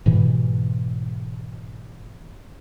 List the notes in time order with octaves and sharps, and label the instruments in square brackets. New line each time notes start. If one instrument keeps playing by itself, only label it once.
[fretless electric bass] G#2 B2 E3